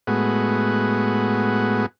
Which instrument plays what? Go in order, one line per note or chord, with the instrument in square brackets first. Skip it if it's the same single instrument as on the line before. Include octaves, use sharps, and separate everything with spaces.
[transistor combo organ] A2 G#3 B3 F#4